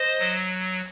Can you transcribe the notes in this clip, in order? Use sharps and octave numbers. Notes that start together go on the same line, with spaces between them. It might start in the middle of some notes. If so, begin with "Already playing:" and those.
Already playing: C5 D#5
F#3